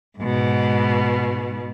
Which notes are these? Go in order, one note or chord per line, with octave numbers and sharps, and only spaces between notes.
G#2 B2